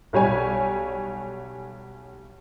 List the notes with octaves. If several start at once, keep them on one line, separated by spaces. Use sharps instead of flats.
B1 G3 C#5 G#5